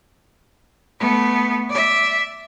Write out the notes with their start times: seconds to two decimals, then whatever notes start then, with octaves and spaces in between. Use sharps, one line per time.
1.00 A3 B3
1.70 D5 E5